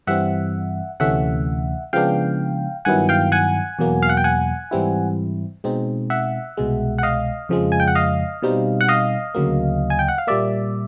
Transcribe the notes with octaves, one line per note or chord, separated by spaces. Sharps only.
G2 E3 G3 C4 E5 F#5
D2 C3 E3 A3 C#4 E5 F#5
C#3 F3 G#3 B3 D4 F5 G5
G2 D#3 F#3 B3 E4 F#5 G#5
F5 G5
F#5 G#5
E2 B2 F#3 A#3
F5
F#5
G5
F#5 G#5
G#2 E3 G3 C4 E4
B2 G#3 C4 D#4
E5 F#5
C2 B2 G#3
F#5
D#5 F5
F2 C#3 F3 G#3
G#5
G5
F#5
D#5 F5
B2 G3 C4 D#4
F#5
D#5 F5
D2 C#3 F#3 A#3
G#5
G5
F#5
F5
A#2 G3 A#3 D5 E5